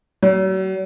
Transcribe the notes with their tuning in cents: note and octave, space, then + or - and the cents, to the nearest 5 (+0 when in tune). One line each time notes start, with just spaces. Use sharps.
F#3 +40